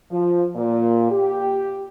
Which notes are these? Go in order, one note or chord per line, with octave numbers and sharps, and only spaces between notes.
F3
A#2
G4